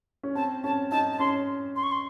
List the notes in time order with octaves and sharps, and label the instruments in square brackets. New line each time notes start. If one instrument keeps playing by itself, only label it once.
[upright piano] C#4
[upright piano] C4 [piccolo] A5
[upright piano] C#4 [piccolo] A5
[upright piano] D#4 [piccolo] A5
[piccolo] A5
[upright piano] C#4 [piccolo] C6
[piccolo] C6
C#6
C6